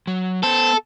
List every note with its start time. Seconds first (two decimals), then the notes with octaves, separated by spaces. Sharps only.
0.07 F#3
0.44 B3 A4 C5